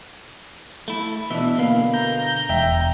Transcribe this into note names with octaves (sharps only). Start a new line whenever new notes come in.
A3 E4
B2 E3 D4 E5
D3 A#3 B4 F5
A#5 G6
E1 E5 G5